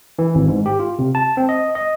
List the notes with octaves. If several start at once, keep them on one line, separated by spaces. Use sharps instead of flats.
E3
G#1
G#2
G4
F4
C3
A5
C4
D#5
D#5